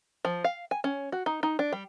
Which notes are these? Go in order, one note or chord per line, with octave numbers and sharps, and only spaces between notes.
F3
F5
G#5
C#4
F#4
D#4
D#4
D4
G3